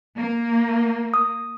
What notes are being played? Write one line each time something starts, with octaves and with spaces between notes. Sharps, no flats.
A#3
D#6